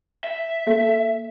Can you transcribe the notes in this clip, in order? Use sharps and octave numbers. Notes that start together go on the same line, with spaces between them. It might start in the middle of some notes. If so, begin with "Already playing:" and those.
E5
A#3 A4 B6